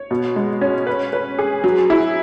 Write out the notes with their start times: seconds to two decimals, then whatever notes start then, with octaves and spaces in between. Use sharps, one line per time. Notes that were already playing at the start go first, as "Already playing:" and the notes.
Already playing: C#5
0.11 B2
0.36 G#3
0.61 C#4
0.87 B4
1.13 B4
1.39 G#4
1.64 F#3
1.90 E4